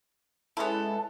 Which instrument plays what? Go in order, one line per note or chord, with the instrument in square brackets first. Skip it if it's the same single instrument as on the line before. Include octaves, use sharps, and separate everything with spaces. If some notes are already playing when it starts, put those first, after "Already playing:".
[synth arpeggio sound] G#3 C#4 E4 [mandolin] B3 A4